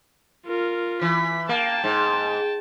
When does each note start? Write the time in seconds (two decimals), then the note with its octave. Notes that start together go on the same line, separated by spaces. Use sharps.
0.47 F4 A#4
1.02 E3 B6
1.49 A#3 G5 A5
1.84 G#2